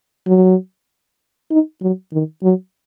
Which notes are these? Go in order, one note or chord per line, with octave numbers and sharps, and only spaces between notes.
F#3
D#4
F#3
D#3
F#3